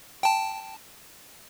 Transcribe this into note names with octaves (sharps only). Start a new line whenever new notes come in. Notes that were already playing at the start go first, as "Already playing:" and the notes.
G5 A5